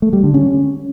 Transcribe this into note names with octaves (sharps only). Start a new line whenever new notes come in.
A3
G3
D3
C#4